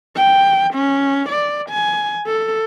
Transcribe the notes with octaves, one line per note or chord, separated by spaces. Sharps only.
G5
C#4
D5
G#5
A4